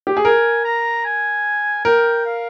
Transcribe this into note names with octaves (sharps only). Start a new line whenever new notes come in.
G4
G#4
A#4 G#5
A#5
G#5
A#4 G5
F5